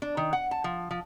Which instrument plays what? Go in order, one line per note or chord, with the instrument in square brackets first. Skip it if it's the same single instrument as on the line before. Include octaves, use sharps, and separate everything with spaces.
[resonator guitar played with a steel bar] D4
D#3
F#5
A5
F3
F3